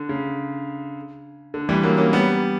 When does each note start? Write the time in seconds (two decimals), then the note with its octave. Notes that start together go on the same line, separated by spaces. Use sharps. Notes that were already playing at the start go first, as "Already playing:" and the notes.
Already playing: D3
0.09 C#3
1.54 D3
1.69 E3 G3
1.83 F#3 A#3
1.97 A#3 C#4
2.13 G3 B3